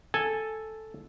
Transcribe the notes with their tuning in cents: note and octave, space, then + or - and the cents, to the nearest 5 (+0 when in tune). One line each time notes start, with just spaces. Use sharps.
A4 +0 G#5 +0